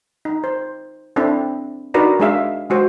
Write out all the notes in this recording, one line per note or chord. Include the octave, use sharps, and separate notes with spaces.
D#4
C5
C4 D4 E4 A4
D4 D#4 F#4 A#4 B4 D5
G#3 D4 G#4 E5 F5
G#3 F#4 C5